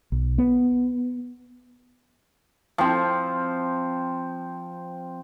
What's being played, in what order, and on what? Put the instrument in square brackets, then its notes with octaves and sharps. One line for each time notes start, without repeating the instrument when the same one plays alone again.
[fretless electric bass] B1
B3
[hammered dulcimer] F3 C4